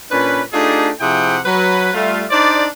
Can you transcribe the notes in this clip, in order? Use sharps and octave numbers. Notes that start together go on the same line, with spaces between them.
A#2 C#4 D4 B4
A3 D4 D#4 F4 G4 G#4
C3 F3 E4 G#4 F#5 G5
F#3 B4
G3 A3 F4
D4 D#4 C5 D5